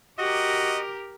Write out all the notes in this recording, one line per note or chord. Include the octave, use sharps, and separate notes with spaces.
F#4 G4 A#4 D#5